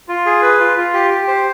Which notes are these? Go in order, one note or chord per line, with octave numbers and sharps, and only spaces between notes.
F4
G#4
B4
F4
F4
G4
G4
C5